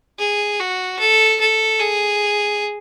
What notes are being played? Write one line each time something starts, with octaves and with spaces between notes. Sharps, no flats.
G#4
F#4
A4
A4
G#4